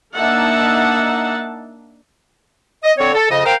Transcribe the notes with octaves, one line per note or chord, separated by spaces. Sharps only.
A#3 D4 D#4 E5 F#5 A5
D#5
D3 C4 C#5
A4
F2 C#3 D#5
A#4 C5 F5 G5